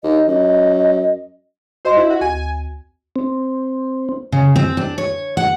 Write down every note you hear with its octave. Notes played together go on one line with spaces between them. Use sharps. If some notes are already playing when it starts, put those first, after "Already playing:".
D#2 D#5
F#2 D#5
F#4 C5 D#5 C6
E4
F#4
D2 G#5
C4
C#3
C4
D4
C#5
F#5